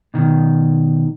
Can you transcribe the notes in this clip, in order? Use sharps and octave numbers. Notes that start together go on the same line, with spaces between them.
B2 D#3